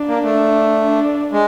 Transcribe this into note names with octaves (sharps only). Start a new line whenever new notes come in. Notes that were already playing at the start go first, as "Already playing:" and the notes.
Already playing: D4
A#3
A3
D4
G#3